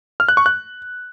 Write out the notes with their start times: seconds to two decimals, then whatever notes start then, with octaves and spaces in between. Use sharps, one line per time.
0.20 F6
0.28 F#6
0.37 C#6
0.46 F#6